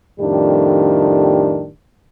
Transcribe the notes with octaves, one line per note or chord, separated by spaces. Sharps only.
F2 A2 D#3 G3 D4 G4